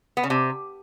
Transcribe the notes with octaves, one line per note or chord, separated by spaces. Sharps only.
B3
C#3
C3